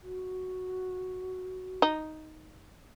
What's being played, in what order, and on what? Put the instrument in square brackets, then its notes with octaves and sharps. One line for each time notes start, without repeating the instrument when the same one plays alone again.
[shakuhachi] F#4
[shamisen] D#4